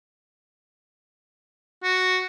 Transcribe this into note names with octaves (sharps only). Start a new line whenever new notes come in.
F#4